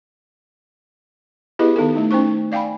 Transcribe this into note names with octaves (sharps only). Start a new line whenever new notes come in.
B3 E4 G4 G#4 B4 D#5
D#3 B3 D#4 A4
A3 D#4
C#4 D#4 C5 C#6
D5 F5 G5 G#5 B5